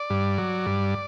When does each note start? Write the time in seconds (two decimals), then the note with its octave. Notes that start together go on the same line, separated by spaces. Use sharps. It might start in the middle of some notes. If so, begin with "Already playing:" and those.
Already playing: D5
0.10 G2
0.38 F#3
0.66 G2